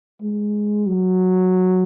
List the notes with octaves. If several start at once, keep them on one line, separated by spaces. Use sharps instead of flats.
G#3
F#3